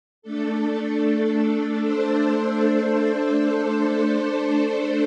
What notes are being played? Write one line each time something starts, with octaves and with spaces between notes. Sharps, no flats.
A3 D4 A4
A3 D4 A4 C5